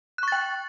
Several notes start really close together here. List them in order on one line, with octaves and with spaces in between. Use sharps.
F#6 C#6 A6 G5